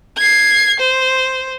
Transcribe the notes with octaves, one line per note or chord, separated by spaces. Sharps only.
G#6 C7
C5